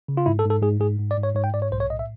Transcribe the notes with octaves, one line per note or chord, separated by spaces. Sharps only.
C#3
F4
G#2 E4
A4
G#2
A4
G#2 G#4
G#2 G#4
G#2
D5
G#2
C#5
G#2 C#5
G5
G#2 D5
C#5
B1 C5
C#5
A2 D#5
E5